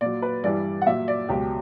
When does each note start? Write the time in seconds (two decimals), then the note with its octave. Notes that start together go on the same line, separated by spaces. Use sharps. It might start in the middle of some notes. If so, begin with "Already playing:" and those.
0.01 A#2 F#3 D5
0.22 B4
0.44 G2 E3 G3 D5
0.82 F#5
0.86 A#2 F#3 E5
1.08 D5
1.29 C#2 B2 F#3 G4